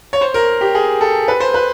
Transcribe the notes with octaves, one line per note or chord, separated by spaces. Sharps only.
C#5
C5
A#4
G4
G#4
A4
B4
C5
B4